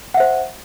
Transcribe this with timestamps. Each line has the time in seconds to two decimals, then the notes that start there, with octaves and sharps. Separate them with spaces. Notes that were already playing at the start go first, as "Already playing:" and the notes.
0.14 F#5
0.17 E5
0.20 C5